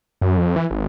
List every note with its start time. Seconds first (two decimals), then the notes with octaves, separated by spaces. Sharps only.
0.21 F#2
0.37 F2
0.56 E3
0.71 G#1